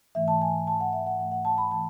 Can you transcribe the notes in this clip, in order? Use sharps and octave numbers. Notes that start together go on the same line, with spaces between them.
G#2 E3 A3 E5
A5
G#5
G#2 E3 A3 A5
F#5
E5
F#5
G#2 E3 A3 F#5
F#5
A5
B5
E3 A3 A5